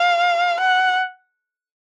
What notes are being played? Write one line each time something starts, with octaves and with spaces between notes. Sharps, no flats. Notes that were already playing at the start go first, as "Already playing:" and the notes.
Already playing: F5
F#5